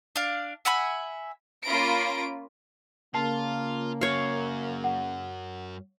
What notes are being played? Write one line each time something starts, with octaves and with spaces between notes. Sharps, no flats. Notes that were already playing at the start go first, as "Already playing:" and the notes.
D4 F5
E5 F#5 G#5 B5
A#3 C#4 F4 B5 A#6 D7
C#3 A#3 F4 A5 C7
F#2 C#5 F5
F#5